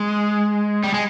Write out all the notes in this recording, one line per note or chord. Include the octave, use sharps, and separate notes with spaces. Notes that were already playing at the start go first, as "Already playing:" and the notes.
Already playing: G#3
G3
G#3